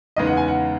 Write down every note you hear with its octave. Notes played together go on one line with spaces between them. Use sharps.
E2 C#3 G#3 B3 D#4 D#5
F#5
G#5
F#5